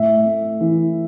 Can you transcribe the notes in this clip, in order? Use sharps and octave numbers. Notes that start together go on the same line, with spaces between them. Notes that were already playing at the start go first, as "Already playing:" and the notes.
Already playing: A2 E5
A3
E3